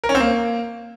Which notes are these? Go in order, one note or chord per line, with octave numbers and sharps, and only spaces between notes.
A#4
C#4
C4
A#3